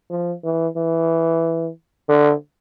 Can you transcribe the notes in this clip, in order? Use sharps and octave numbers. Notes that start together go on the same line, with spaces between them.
F3
E3
E3
D3